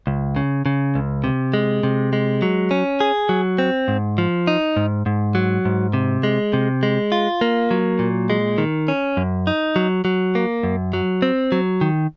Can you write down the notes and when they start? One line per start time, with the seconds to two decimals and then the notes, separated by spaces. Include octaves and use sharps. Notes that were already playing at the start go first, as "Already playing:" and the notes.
0.07 C#2
0.36 C#3
0.66 C#3
0.95 C#2
1.24 C3
1.54 G#3
1.83 C3
2.13 G#3
2.42 F#3
2.71 C#4
3.00 G#4
3.29 F#3
3.58 C4
3.88 G#2
4.18 F3
4.47 D#4
4.77 G#2
5.06 G#2
5.35 F#3
5.65 G#2
5.93 C3
6.23 G#3
6.53 C3
6.83 G#3
7.12 F4
7.41 A#3
7.71 F#3
7.99 A#2
8.30 G#3
8.58 D#3
8.88 C#4
9.17 F#2
9.47 D#4
9.76 F#3
10.05 F#3
10.35 A#3
10.63 F#2
10.93 F#3
11.22 C4
11.52 F#3
11.81 D#3